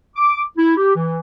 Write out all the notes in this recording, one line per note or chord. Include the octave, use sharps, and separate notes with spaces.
D6
E4
G4
E3